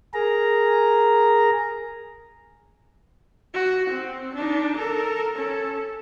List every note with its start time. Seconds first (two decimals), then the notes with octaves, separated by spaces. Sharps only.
0.14 G#4 A#4 A#5
3.54 F#4
3.89 C4
4.34 D4 D#4
4.76 A4 A#4
5.36 C#4 A4